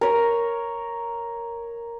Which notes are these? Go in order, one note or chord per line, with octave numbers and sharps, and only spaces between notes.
A#4 C#5